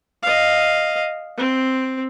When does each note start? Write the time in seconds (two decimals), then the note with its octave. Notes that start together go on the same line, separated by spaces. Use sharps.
0.23 D#5 F5
1.37 C4